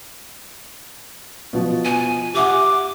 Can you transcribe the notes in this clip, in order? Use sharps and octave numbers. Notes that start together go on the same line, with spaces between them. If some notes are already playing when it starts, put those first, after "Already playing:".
B2 F3
G#5
G4 E5 F#5 D6